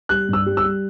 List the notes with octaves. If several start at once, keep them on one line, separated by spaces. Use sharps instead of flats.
G3 F#6
G2 E6
G3
E6
G3